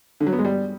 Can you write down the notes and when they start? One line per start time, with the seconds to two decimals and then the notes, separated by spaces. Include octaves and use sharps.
0.20 D3
0.27 F#3
0.33 B3
0.39 G#3
0.45 G3